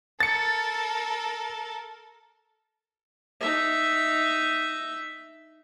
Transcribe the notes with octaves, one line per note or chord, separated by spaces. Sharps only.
A4 A#4 A6 C#7
D#4 E5